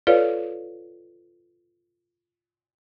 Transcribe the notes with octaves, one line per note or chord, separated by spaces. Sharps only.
F4 A4 B4 C#5 D5 F5